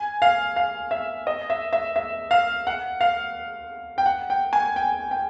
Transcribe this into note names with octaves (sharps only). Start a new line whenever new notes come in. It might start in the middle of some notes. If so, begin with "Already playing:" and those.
Already playing: G#5
F5
F5
E5
D#5
E5
E5
E5
F5
F#5
F5
G5
F#5
G5
G#5
G5
G5